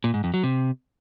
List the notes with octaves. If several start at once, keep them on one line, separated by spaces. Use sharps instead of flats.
A#2
G#2
F2
F#3
C3